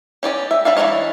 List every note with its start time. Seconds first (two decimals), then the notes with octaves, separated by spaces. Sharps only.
0.23 C#4 G4 D5 D#5
0.51 E5
0.65 G3 D4 E5 F5
0.77 E3 F#3 D4 C#5 D#5